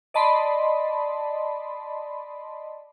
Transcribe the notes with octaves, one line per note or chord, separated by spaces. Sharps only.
D5 D#5 A5 B5 C6